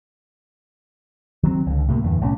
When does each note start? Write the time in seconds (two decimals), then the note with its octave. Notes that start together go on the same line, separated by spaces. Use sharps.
1.43 D#3 F#3 G#3 C4
1.66 C#2 D3
1.88 A2 C3 F#3 A#3
2.03 E2 G2 D3 E3
2.21 B1 A2 G3 C#4